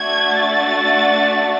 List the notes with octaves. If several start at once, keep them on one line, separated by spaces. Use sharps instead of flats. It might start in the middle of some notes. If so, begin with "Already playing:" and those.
Already playing: A3 D4 F#4 G#6
A6